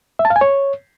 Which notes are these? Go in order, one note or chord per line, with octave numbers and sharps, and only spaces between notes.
E5
A5
F5
G#5
C#5